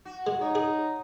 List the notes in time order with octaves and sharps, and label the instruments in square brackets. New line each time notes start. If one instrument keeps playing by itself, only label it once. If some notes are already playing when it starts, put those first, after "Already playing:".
[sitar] F#4
[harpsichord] G#3
[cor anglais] D#4 [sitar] C#5
[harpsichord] G#4